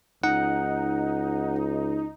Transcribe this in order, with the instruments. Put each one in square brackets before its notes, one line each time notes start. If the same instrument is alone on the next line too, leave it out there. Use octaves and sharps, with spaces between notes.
[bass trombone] C#2 [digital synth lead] D#4 [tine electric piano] F#5